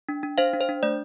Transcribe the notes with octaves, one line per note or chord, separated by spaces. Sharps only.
D4
D4
D4 C5 F5
D4
C5
D4
A3 D5